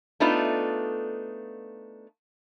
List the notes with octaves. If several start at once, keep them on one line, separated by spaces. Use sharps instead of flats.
A3 B3 D4 D#4 F4 A4